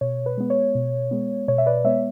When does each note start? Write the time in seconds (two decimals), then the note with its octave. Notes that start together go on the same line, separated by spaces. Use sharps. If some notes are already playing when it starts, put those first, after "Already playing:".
0.01 B2 C#5
0.26 B4
0.38 G#3 B3
0.50 C#5
0.75 B2
1.11 G#3 B3
1.48 B2 C#5
1.58 E5
1.66 B4 D5
1.84 G#3 B3 C#5 E5